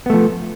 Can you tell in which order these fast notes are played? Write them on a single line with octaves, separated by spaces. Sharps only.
B3 A3 F3